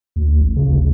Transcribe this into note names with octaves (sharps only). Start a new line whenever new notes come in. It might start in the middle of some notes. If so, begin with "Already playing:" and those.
D2
A1
C#3
D2